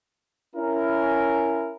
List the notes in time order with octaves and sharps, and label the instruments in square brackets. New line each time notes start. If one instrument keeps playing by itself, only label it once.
[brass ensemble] C#4 E4 A#4